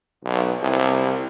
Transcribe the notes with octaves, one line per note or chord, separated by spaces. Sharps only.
B1
C2